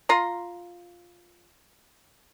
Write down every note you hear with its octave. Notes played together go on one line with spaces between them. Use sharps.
F4 A#5 C6